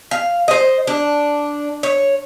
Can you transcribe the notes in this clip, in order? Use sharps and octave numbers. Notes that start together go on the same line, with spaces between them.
F5
C5 D#5
D4
C#5